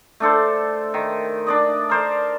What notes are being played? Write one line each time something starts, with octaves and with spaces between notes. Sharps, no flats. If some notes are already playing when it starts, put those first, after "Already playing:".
A3 D4 A4 C5
D#3
D4 D5 D#5
A#4 C5 D5